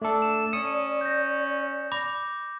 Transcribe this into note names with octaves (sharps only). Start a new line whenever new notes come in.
A3 D4 A4 D5
E7
C#4 D#6 C#7
G6 A#6
B5 D6 A#6